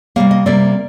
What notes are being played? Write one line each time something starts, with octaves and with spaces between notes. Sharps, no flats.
C3 G3 A#3 F5
D#5
C3 G3 A#3 D5